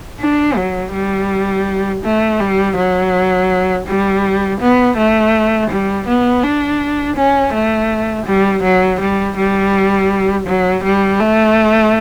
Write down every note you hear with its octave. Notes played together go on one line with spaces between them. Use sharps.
D4
F#3
G3
A3
G3
F#3
G3
B3
A3
G3
B3
D4
C#4
A3
G3
F#3
G3
G3
F#3
G3
A3